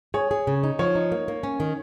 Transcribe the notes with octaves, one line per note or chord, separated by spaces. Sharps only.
G#4 C#5
G#4
C#3
D#4
F3 C#5
D#4
A#3
A#3
C#4
D#3